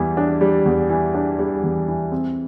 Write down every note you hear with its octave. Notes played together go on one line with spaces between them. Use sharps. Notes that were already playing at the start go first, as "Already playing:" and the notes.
Already playing: E2 E3 G3
D4
G3
E2
E3
D4
G3
E2
E3
C4